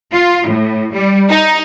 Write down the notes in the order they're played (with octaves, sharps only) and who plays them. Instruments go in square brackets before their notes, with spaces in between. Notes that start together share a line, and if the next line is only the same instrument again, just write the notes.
[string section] F4
A2
G3
D#4